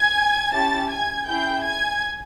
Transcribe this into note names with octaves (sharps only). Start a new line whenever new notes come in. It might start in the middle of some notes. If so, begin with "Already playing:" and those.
Already playing: G#5 G#6
C#4 E4 G4 A5 A6
G#5 G#6
C#4 E4 G#4 G5 G6
G#5 G#6